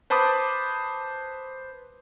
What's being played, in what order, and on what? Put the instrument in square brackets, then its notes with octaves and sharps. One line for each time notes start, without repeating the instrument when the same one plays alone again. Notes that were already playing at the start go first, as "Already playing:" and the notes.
[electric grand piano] B4 C5 A5 B5 D6 D#6